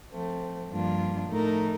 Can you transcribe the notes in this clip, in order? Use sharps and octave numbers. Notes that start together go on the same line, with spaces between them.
F3 A3 C4
G2 F3 A#3 D4 F4
A2 F3 A3 D#4 A#4